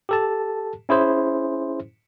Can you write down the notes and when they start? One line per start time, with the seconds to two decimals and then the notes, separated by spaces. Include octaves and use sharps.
0.09 G4 A4 A5
0.89 C#4 E4 G#4 C5